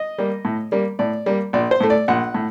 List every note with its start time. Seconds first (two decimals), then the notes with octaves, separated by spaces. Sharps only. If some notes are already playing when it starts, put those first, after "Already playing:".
Already playing: D#5
0.18 G3 A#3
0.45 A2
0.72 G3 A#3
0.99 A2 D5
1.26 G3 A#3
1.53 A#1 D5
1.71 C5
1.80 A2 A3
1.90 D5
2.08 A#1 F#5
2.34 A2